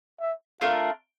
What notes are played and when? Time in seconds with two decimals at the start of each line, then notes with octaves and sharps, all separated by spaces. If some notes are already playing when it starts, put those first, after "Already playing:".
0.20 E5
0.61 A3 D4 F4 A#4 F5